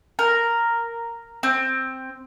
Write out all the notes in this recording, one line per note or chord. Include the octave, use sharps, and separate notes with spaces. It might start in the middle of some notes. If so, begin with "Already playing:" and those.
A#4
C4